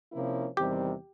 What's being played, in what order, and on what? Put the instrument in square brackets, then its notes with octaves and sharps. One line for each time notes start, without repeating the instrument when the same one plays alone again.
[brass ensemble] C3 F3 A#3 C#4 E4
[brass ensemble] E2 C3 D#3 G3 C4 [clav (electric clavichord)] G4